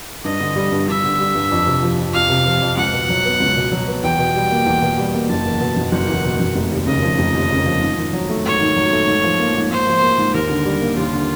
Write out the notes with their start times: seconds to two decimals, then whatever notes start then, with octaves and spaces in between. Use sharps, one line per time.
0.24 G2 D#5
0.40 D3
0.56 G3
0.72 G2
0.88 G2 E5
1.04 D3
1.19 G3
1.35 G2
1.51 F2
1.67 C3
1.82 F3
1.99 F2
2.14 F2 F5
2.30 C3
2.46 F3
2.61 F2
2.77 C#2 F#5
2.93 B2
3.09 F#3
3.25 B3
3.40 C#2
3.56 B2
3.72 F#3
3.87 B3
4.03 E2 G5
4.19 B2
4.35 G3
4.51 A#3
4.66 E2
4.82 B2
4.98 G3
5.14 A#3
5.30 F#1 A5
5.45 E2
5.61 B2
5.76 F#1
5.92 F#1 F#5
6.08 E2
6.24 B2
6.39 F#1
6.55 F1
6.72 D#2
6.87 C#3 D#5
7.02 F3
7.19 F1
7.34 D#2
7.50 C#3
7.66 F3
7.81 G#2
7.97 D#3
8.13 F#3
8.29 A3
8.45 G#2 C#5
8.60 D#3
8.76 F#3
8.93 A3
9.08 G#2
9.24 F3
9.39 A#3
9.55 G#2
9.71 G#2 C5
9.87 F3
10.03 A#3
10.18 G#2
10.34 D#2 A#4
10.49 D3
10.65 G3
10.82 A#3
10.97 D#2 F4
11.13 D3